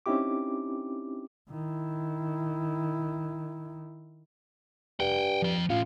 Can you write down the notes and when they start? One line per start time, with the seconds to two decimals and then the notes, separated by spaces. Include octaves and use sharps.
0.06 C4 C#4 D#4 E4 G4 D6
1.50 D#3 E4
5.00 G2 F#5 G5
5.42 F3 G5
5.70 A2 C#4 F4